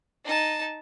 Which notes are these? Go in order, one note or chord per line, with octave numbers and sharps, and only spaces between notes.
D#4 A5